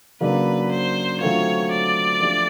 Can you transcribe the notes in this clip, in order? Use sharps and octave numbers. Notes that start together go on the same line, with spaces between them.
C#3 F#3 A#3 D4 B4
C5
D3 F#3 A3 C4 F4 C#5
D5
F3 A3 D4 G4